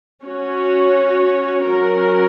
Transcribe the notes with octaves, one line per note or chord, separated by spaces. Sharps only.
C#4 F#4 C#5
F#3 C#4 F#4 A#4